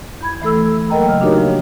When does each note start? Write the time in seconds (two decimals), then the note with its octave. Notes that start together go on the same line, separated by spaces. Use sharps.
0.21 E2 B5 G#6
0.42 E3 A3 A4 E6
0.90 F#3 A#3 A#4 D#5 G5 A#5
1.06 C#3 F6
1.21 D4 D#4 F#4 G4 A#4 C#5
1.38 F3